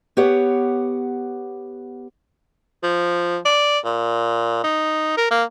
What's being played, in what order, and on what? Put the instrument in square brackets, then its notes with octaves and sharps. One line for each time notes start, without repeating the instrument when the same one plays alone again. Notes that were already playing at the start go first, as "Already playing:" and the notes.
[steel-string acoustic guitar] B3 G4 C#5 F#5
[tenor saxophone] F3
D5
A#2
D#4
A#4
A#3